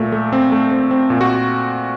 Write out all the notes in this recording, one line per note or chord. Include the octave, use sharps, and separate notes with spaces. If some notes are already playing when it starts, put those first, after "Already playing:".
Already playing: A#2 A3
A3
C4
A3
C4
C4
A#2
F#4